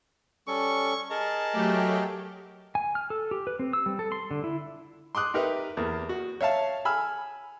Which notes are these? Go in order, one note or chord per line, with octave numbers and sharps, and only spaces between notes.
G3 C#4 A4 C#6
G#4 A#4 D#5 A5
F#3 A3 G4
G#5
F6
A4
G4
B4
C4
E6
G3
A4
C6
D3
E4
C6 D6 D#6 F#6
D#4 G4 A#4 B4 E5
E2 A#3
F#4
C#5 E5 F5 A5
G#5 B5 E6 F6